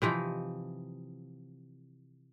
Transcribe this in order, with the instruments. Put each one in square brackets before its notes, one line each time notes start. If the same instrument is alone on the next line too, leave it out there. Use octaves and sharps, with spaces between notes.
[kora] C3 E3 F3 D#4